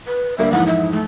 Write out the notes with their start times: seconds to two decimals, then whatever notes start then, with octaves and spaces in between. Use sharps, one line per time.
0.07 B4
0.38 D2 G3 A#3 E5
0.52 F2 G#2 E3 F#5
0.67 E5
0.92 A3